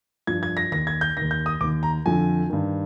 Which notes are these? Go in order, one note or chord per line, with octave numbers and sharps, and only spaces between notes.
G2 F3 G#6
G#6
A#6
D#2 D#3 A#6
G#6
G6
D#2 D#3 A#6
G6
D#6
D#2 D#3 D6
A#5
F2 D3 F3 G#5
G2 D#3